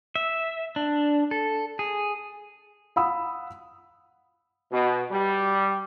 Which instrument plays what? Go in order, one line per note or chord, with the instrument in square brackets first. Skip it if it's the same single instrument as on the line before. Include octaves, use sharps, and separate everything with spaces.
[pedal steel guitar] E5
D4
A4
G#4
[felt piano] F5 F#5 B5 D#6 E6
[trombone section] B2
G3